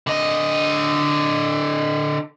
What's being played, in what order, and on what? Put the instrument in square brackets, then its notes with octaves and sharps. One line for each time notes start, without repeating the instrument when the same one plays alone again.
[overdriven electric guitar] D3 D#5